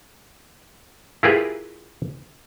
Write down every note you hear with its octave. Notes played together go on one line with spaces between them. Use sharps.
E4 F4 G4 G#4 A#4 B4